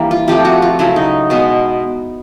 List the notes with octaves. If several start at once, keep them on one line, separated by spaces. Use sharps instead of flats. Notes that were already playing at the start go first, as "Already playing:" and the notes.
Already playing: E3 G3 A#3 D4
F4
C3 F3 A3 G4
F#4
F4
C#3 F#3 A3 E4
D#4
B2 G#3 B3